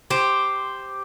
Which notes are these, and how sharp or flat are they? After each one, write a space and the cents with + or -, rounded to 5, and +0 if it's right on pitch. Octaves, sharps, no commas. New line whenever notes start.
G4 +0 C5 +0